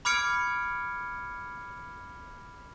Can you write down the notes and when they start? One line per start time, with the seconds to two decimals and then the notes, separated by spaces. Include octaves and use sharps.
0.05 B5 D6 F6 G#6 C#7 D7